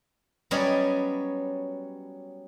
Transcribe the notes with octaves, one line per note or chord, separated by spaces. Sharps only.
F#3 G3 B3 C#4 D5 D#5